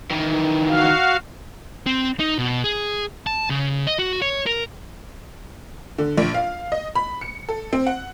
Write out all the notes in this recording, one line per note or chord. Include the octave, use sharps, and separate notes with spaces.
D#3 E3
F#4 F5
C4
D#4
B2
G#4
A5
C#3
D#5
F#4
C#5
A#4
D3
A#1
F5
D#5
B5
C#7
A4
C4
F#5